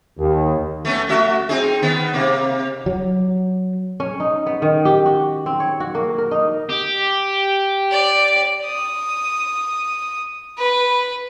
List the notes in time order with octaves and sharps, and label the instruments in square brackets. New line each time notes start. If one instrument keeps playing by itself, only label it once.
[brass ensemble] D#2
[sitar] A3 B3 C#4
A3 F#4 E5
C4 D#4 G#4
D#3 B3
C3 A#3
[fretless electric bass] F#3
[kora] C#4
D#4
B3
D#3
G4
F#4
C4
C#5
F#4
A#3
A#4
D#4
[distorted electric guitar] G4
[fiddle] D5
D#6
B4